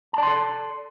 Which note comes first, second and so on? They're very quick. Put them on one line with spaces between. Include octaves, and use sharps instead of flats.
A5 D5 C6 A4